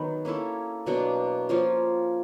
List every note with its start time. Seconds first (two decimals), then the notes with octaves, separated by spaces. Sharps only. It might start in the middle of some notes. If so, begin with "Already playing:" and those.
Already playing: D#3 F#3 B3
0.25 A#3 C#4 E4 A4
0.86 B2 F#3 A#3 D4
1.49 F3 A#3 C#4 F4